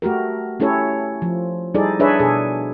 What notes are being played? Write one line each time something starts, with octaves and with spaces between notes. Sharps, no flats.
A3 F#4 G4 A#4
A3 C#4 E4 G4 A4 C#5
F3
G3 D#4 E4 G#4 A4 D5
D4 G#4 B4 C#5 D5 E5
B2 G#4 A4